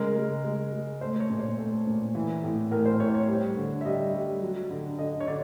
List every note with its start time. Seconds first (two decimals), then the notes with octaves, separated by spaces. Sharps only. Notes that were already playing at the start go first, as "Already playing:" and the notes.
Already playing: C#3 G#3 A#4
0.16 G#3
0.44 G#3
0.73 G#3
1.01 A3 C5
1.20 C#5
1.30 A#2
1.40 C5
1.58 A3
1.87 A#2
2.15 E3
2.44 A2
2.71 A2 A#4
2.85 C5
3.00 A2 C#5
3.14 C#5
3.28 G3
3.57 D3
3.81 E5
3.85 G3 D#5
4.14 G3
4.42 F#3
4.70 D3
4.98 D3 D#5
5.20 C#5
5.27 D3 D5